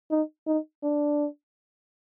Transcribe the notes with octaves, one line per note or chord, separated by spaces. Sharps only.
D#4
D#4
D4